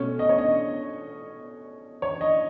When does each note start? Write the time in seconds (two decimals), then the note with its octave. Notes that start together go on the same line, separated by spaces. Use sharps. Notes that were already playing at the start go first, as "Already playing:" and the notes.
Already playing: B2 A3 C#4
0.19 D#5
0.29 C#5
0.38 D#5
2.02 C#5
2.21 D#5